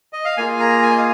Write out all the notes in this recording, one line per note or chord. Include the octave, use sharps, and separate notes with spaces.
D#5
F5
A#3 F4 G#4 G#5
A#5
G#5
D#5
F5